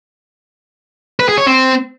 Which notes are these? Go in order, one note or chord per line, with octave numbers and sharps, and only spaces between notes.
B4
G#4
C#5
C4